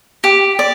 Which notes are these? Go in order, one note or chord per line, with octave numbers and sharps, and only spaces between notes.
G4
D5